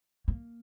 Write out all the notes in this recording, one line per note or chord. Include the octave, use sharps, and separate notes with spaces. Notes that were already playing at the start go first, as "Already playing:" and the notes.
A#3